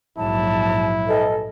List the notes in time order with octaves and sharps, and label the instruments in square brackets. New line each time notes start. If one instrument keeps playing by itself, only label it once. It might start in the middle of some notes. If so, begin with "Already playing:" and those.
[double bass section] A#1 G#2 F#3 [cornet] E4 [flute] A5
[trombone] A4 [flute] D#5